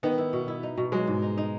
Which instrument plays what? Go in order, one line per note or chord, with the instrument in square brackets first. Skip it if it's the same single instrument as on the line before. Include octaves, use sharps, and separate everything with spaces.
[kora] D#3 [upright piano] B3
[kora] E4
B2
E4
D#4
B2
[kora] F#3 [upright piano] G#3
[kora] G#2
D#4
D#4